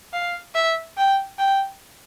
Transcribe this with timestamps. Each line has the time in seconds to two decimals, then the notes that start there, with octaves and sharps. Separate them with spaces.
0.13 F5
0.55 E5
0.97 G5
1.38 G5